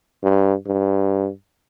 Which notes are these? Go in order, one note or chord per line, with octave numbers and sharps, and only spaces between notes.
G2
G2